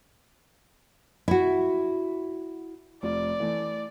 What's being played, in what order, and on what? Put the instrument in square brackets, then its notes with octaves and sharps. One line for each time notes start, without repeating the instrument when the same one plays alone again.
[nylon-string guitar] E4 F#4
[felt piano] F1 F4 [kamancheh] D5
[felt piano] E3 A3